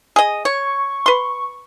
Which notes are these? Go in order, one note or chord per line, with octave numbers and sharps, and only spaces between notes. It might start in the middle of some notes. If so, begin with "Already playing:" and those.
G#4 D#5
C#5 C#6
B4 C6